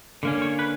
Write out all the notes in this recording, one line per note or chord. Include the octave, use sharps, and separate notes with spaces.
D3 A#3 C#4
C#5
B4